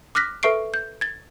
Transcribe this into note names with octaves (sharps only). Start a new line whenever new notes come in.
D6 F6 F#6 A#6 B6
A4 B4 E5 C#6 C7 D7
G6
G#6 A6